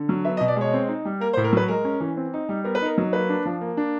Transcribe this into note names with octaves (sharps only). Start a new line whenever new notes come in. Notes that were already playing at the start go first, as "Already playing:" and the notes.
Already playing: D3
F#3
B3 E5
D#5
B2
D5
G#3 C#5
C4
D#4
G3
A#3 A#4
C5
A2
A#4
F#3 B4
G#3 A#4
C#4
E3
C4
D#4
G3
B3 A#4
B4
D#4 A#4
F#3
A#3 B4
D4
F3
A#3
D4